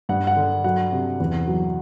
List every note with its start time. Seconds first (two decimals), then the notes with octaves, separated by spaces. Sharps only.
0.09 G2 F#5
0.27 F#5
0.36 D3
0.64 F#3 F#5
0.92 C3
1.20 E2
1.48 F#3